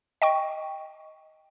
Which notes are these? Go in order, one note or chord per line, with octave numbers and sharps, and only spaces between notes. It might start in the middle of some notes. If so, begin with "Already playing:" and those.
D#5 G5 C#6